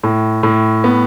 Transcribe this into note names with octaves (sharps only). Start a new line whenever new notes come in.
A2
A2
B3